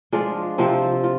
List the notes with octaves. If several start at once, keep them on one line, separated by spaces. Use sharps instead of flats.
F3 G#3 D4 F4
C3 F3 C4
F4